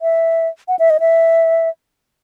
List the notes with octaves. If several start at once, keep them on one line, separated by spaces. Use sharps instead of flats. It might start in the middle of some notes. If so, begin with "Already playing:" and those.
E5
F#5
E5
D#5
E5